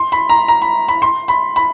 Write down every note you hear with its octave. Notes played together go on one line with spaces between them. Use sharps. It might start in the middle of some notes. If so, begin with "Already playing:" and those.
Already playing: C6
B5
A#5
A#5
B5
B5
C6
B5
B5